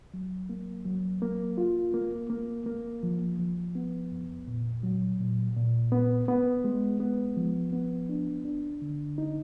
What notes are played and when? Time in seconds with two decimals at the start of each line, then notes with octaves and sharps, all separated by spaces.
0.14 F#3
0.49 A#3
0.86 F#3
1.22 A#3
1.58 F4
1.94 A#3
2.30 A#3
2.66 A#3
3.03 F3
3.39 F3
3.75 B3
4.11 F2
4.48 A#2
4.83 F#3
5.20 A#2
5.56 A#2
5.92 B3
6.28 B3
6.64 G#3
7.00 B3
7.37 F3
7.73 B3
8.09 D4
8.45 D4
8.82 D3
9.18 D#4